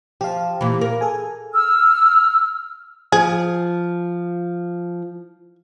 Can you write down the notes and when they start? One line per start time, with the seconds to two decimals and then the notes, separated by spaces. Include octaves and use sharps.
0.21 F3 G4 F5
0.61 A#2 E3
0.81 A#4
1.01 G#4 A4 G#5
1.54 E6 F6
3.12 F3 G#4